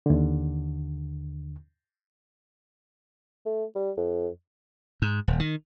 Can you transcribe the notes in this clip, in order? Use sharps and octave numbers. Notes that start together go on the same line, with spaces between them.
D#2 D3
A3
G3
F2
G#2
D#1
D#3